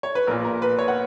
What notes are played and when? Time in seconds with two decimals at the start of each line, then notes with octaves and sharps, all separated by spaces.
0.03 C#5
0.15 B4
0.27 A#1 A#4
0.31 A#2
0.44 A#4
0.62 B4
0.79 C#5
0.88 F#5